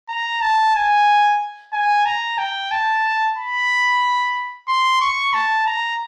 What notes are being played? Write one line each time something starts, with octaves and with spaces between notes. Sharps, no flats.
A#5
A5
G#5
G#5
A#5
G5
A5
B5
C6
C#6
A5
A#5